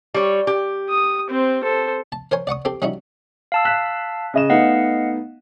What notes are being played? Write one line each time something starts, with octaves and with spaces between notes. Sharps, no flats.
G3 C#5
G4
D#6
C4 C5
A4 C5
A5
A#4 C5 C#5 G#5
D5 F#5 C#6 D#6
C4 G4 A4
G3 C#4 D#4 E4 F#4
F5 A5 E6
F#6 B6 E7
C#3 D#5 E7
A3 B3 D#4 D#5 F5 F#5